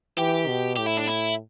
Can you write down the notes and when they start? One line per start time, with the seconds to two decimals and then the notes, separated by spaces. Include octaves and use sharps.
0.17 E3 G4
0.48 B2
0.77 A2 G4
0.87 E4
0.97 D4
1.08 E4